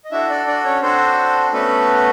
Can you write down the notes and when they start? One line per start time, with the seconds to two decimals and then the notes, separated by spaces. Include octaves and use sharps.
0.04 D#5
0.11 D4 E4 F#4 A4 E5
0.30 D4 D5
0.47 D4 D5
0.64 C#4 C#5
0.82 C4 D4 F#4 A4 C5
1.52 A3 B3 C#4 F#4 A4 B4